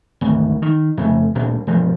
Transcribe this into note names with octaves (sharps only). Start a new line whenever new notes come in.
G#1 D2
D#3
F2 C#3 A3
D2 A#2 G3 D4
E1 G2 F3